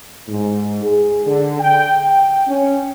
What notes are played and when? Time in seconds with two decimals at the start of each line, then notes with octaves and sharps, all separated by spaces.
0.28 G#2
0.82 G#4
1.26 D3
1.59 G5
2.01 G5
2.47 C#4